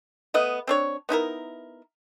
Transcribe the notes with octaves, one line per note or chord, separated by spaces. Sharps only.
A3 B3 D#5
C4 D4 C#5
B3 D#4 E4 A#4